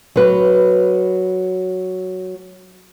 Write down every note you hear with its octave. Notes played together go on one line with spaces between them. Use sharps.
F#3 B4